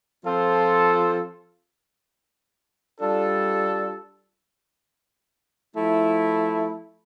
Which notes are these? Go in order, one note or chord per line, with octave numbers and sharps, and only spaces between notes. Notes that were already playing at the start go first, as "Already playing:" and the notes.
F3 C4 F4 A4 C5
G3 D4 F4 A4
F3 A3 E4